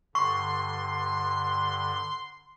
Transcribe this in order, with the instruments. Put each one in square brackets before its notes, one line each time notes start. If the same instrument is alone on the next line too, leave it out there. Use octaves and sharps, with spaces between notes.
[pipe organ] G2 D3 [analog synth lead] C6 [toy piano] C#6